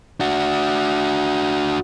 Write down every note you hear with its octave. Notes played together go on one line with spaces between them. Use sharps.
D4 F#4